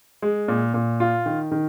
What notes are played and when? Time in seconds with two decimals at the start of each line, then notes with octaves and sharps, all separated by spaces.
0.22 G#3
0.48 A#2
0.74 A#2
1.00 F4
1.26 D#3
1.51 D#3